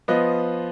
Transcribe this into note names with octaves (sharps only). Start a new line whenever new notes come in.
F3 B3 F4 B4 D#5